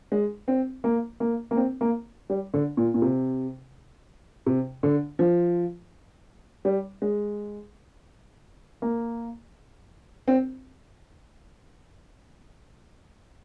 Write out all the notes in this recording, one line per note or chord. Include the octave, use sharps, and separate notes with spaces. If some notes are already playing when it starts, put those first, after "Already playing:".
G#3
C4
A#3
A#3
A#3
C4
A#3
G3
D3
A#2
A#2
C3
C3
D3
F3
G3
G#3
A#3
C4